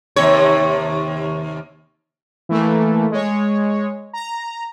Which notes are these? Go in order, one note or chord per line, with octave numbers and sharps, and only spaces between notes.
D#2 C3 C#5
E3 A3 A#3
G#3 C#5
A#5